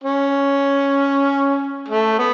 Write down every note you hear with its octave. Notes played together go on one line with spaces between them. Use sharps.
C#4
A3
B3